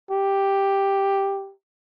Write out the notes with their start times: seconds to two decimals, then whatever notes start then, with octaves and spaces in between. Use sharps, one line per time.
0.11 G4